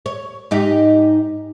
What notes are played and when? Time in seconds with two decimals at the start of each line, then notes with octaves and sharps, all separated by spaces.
0.06 C#5
0.51 G#2 D#4 G4